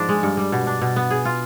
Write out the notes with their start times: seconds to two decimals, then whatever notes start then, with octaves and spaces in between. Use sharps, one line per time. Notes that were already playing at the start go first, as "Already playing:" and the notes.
Already playing: G#2 F3 D4
0.09 G#3
0.23 G2
0.37 G3
0.52 B2
0.67 D4
0.82 B2
0.96 B3
1.11 G#4
1.25 F4